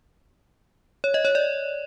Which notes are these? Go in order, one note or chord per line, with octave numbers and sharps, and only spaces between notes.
C#5
D#5
C#5
D5